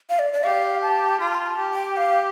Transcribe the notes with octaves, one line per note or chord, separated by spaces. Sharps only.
F5
D5
D5
G4 F5
A5
F4 C6
A5
C6
A5
G4
G5
F5